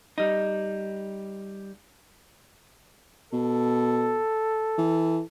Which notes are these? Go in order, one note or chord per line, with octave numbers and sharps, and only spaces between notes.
G3 D#4
B2 A4
E3